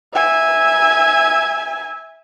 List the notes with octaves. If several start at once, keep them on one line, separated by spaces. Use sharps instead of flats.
E5 G#5